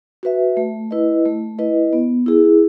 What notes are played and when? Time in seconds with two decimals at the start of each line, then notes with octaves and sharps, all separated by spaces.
0.23 F#4 B4 E5
0.57 A3
0.91 E4 B4 D#5
1.25 A3
1.59 E4 B4 D#5
1.93 B3
2.26 E4 G#4